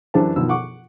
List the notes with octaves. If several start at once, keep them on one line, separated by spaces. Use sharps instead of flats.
F#2 E3 D4 G4 C5 A5
B2 D#3 F3 E6
F#5 C#6 D6